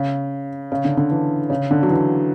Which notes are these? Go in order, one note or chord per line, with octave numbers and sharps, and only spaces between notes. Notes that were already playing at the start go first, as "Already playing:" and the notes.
Already playing: C#3
C#3
D3
D3
E3
C#3
D3
F#3
E3